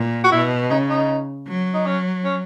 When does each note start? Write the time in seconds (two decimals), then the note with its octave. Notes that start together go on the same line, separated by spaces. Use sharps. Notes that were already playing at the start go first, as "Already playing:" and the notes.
Already playing: A#2
0.24 F#4
0.32 B2 E4
0.70 C#3 D#4
0.89 D#4
1.47 F#3
1.74 D#4
1.86 C#4
2.24 C#4